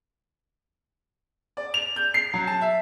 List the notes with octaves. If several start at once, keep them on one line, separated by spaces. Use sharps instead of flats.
D5
F7
G6
C7
F#3
A5
E5